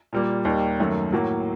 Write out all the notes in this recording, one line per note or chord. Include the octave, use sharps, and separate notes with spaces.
A#2 G3 A#3
D#2 D#3 G3 A#3
F#2 D#3 A3
A2 F#3 A#3